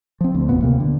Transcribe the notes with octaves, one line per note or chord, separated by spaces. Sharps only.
F3 C4
D2
F#1 D#2 A#2 B3
D#1 C#2 C3 A#3
D3